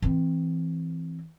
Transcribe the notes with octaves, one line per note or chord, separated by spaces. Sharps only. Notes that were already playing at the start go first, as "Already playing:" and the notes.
E3 C4